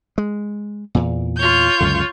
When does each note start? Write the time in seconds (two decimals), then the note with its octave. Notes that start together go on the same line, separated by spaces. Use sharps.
0.18 G#3
0.95 E2 A#2
1.37 F4 C#5 G6
1.81 C#2 F#2 D3